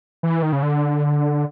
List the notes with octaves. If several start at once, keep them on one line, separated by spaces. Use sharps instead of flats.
E3
D#3
C#3
D3